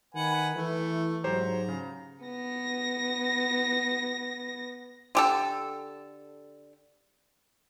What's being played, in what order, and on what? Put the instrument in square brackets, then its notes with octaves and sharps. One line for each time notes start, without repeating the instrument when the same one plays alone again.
[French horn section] D#3 [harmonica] B4 F#5 G#5
[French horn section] E3 [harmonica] A3
[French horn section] G#2 F#3 [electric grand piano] G4 C5 C#5 [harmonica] A#5
[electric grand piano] C#3
[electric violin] B3 A#6
[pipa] D3 G4 A4